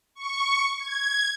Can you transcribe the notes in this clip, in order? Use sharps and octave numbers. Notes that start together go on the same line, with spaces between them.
C#6
G#6